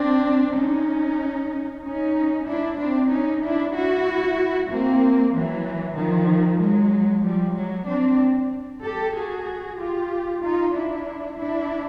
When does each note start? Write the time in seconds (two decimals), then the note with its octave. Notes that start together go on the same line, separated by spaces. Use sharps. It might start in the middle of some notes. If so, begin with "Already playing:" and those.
Already playing: C4 D4
0.55 C#4 D#4
1.83 C#4 D#4
2.47 D4 E4
2.78 C4 D4
3.10 C#4 D#4
3.42 D4 E4
3.74 E4 F#4
4.69 A#3 C4
5.33 E3 F#3
5.96 D#3 F3
6.60 F#3 G#3
7.24 F3 G3
7.56 F#3 G#3
7.87 C4 D4
8.83 G4 A4
9.14 F#4 G#4
9.78 F4 G4
10.42 D#4 F4
10.73 D4 E4
11.38 D4 E4